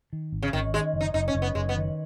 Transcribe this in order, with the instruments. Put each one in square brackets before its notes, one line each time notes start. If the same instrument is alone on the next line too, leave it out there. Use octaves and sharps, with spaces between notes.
[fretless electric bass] D#3
G#1
[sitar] C#3
[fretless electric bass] G#1 [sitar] D#3
[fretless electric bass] D#3 [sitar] G#3
[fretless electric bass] F#1
[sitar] D#4
[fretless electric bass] F#1 [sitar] D#4
[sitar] C#4
[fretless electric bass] F#1
[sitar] B3
[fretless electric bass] F#1 [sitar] G#3
[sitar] B3
[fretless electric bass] D#3